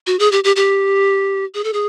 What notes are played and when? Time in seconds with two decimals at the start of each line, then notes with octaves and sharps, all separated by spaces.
0.07 F#4
0.19 G#4
0.32 G4
0.44 G4
0.56 G4
1.54 G#4
1.64 A4
1.73 G#4